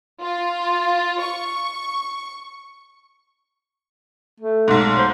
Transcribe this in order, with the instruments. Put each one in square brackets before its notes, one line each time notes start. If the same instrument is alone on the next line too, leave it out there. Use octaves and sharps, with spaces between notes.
[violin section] F4
C#6
[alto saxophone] A3
[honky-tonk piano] B1 G#2
[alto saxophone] C5